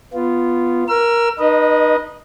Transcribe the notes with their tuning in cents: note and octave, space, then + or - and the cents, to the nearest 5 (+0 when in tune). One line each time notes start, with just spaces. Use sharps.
B3 +0 F4 -10
A#4 +10 E6 +35
D#4 -30 B4 -30 D#5 +0